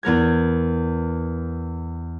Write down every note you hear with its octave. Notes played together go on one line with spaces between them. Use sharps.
E2 B3 A#4 G#6